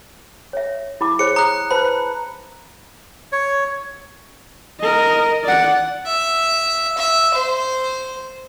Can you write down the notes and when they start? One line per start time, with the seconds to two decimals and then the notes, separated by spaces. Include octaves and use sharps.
0.53 C#5 E5
1.01 E4 B5 D6
1.19 G#4 C5 C#5 C#7
1.36 A#5 D#6 F#6
1.71 B4 C5 A5 B5
3.32 C#5
4.80 A#4 D#5
5.44 D5 F#5
6.06 E5
6.97 E5
7.34 C5